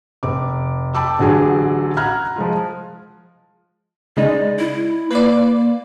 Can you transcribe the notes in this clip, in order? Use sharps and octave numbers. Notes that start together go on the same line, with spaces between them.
F1 D6
G5 A5 B5 D6 E6
A1 D3 F#3 G#4 G#5 D6
F#5 A#5 B5 F6 F#6 G#6
F3 G#3 F4
C#3 G#3 D#4 D5
E4
A#3 B4 D5